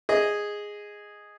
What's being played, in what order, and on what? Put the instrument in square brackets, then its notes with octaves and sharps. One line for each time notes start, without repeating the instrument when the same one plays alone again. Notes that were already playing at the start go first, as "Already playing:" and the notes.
[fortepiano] G#4 D#5